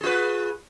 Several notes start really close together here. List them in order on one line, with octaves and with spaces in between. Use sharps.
G#4 F4 B4